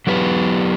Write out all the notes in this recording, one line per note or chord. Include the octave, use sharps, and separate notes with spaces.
F#3 B3 E4 G4 B4